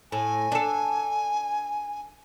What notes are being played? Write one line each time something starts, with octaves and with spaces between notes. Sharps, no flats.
A2 G#5
D4 A4